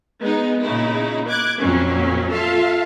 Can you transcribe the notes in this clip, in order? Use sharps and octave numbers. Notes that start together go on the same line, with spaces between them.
G#3 B3 D#4
A#2 C#3 D#4 E4
D6 F#6 G#6
F2 A#2 F#3 C#4
F4 A4 E5 F5 A5